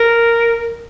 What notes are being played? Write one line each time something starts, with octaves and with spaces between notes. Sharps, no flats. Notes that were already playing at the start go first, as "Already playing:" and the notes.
Already playing: A#4